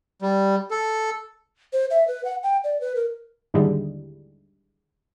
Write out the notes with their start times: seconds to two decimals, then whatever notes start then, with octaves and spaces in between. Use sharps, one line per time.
0.22 G3
0.71 A4
1.73 C5
1.90 E5
2.08 B4
2.25 F#5
2.43 G5
2.64 D5
2.81 B4
2.96 A#4
3.54 D#2 G#2 D3 E3 G3 G#3